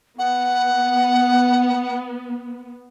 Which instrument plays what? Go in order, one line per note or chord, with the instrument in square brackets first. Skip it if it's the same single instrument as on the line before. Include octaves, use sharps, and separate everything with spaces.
[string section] B3 [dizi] F#5